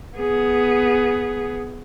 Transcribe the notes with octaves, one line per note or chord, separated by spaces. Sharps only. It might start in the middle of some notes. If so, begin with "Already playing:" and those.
B3 G#4